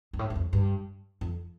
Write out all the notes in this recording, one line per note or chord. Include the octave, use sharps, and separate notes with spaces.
G2
A2
G2
F2
G2
F2